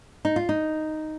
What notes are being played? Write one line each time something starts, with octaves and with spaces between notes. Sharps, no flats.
D#4
F4
D#4